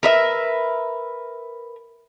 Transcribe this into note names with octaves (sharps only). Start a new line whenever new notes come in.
A#4 B4 E5